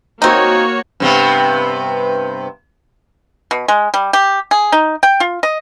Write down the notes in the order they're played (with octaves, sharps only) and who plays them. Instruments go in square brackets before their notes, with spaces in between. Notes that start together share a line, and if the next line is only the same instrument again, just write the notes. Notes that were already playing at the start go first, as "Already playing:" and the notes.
[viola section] A#3 F#4 C#5 [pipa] C4 D#4
[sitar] G2 C3 B3
[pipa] B2
G#3
G3
G4
G#4
D#4
G5
F4
D#5